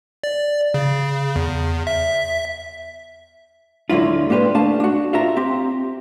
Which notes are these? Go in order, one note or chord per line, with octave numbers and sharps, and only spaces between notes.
D5
C#3
E2
E5
D2 D3 F#3 E4 F4
A#3 D4 G4 B4 C5
A3 D4 F5 A5
D4 F#4
F4 G4 E5 A#5
C4 G4